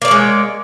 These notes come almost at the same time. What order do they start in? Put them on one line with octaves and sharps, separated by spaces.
A#3 D5 C#5 G#3